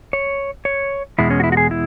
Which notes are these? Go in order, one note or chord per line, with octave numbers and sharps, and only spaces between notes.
C#5
C#5
E2 B2 G#3 E4
C#4
F#4
E4
F#4
G#4
E4